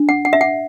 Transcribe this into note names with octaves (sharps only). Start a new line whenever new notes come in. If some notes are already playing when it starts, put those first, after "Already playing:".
Already playing: D4
F#5
F#5
E5
F#5